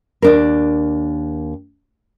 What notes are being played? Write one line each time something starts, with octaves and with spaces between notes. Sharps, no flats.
D#2 D4 A#4